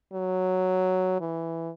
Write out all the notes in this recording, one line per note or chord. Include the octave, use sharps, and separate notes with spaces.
F#3
E3